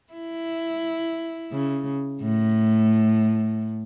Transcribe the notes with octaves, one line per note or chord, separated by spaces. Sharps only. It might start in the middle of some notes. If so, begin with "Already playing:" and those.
E4
C#3
A2